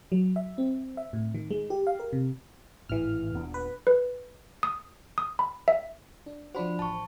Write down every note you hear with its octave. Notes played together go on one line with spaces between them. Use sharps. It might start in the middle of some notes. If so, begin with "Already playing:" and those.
F#3
E5
C4
E5
A2
D#3
G#3
G4
F5
A#4
C3
G#1 A2 E3 F6
D#1 B3 D4
B4
B4
D#6
D#6
B5
E5
D4
F3 D4 F#4 C5 B5
A1 A5 C#6